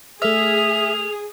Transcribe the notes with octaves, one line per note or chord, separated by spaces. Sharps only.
A3 G#4 E5 F6 F7